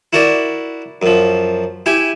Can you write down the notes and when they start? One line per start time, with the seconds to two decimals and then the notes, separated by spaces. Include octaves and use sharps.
0.13 E4 F#4 A#4 D5
1.02 F#2 F3
1.86 E4 G4 G5 G#5